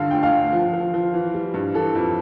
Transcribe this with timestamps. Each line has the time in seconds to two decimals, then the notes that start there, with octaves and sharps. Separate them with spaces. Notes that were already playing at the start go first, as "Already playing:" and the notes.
Already playing: G2 D3 F5
0.11 D2 G5
0.23 F5
0.32 D2
0.53 F3
0.73 F3
0.94 F3
1.14 E3
1.34 G3
1.54 G2
1.74 E3 A4
1.95 F2